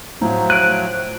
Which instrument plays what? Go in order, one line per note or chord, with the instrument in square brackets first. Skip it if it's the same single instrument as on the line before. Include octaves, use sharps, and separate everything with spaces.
[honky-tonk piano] A2 [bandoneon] F3 F#3 [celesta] A#5
[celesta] C5 D7 D#7 [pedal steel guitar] F#6